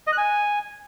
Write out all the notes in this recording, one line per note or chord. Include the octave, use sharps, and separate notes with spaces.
D#5
F#6
G#5